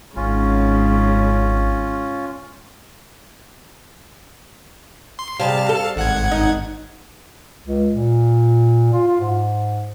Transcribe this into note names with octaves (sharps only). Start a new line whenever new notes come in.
G#1 G#2 C#3 C#4 F4
C6
C3 G3 G#4 F5 A5
A4
G#1 F#5 G#6
D#4
C#2
A#2
F4
F4
G#2